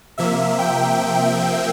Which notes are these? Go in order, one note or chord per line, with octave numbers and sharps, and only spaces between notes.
C3 F3 A#3 E5
G5